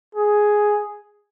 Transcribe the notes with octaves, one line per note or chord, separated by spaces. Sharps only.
G#4